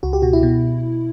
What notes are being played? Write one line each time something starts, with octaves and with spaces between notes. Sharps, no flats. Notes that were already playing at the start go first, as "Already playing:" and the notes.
C#2 F#4
G4
B2 F#4
E4
B2